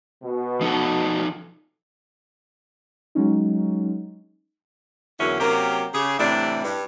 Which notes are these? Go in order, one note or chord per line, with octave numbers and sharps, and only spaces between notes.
B2
F3 D#4 A4
F#3 G#3 C#4 D#4
E2 D3 F#3 A#3 C#4 E4
C3 F#3 A#3 C#4 G4 A#4
C#3 G4 G#4
A2 C3 E3 G3 D4 E4
G2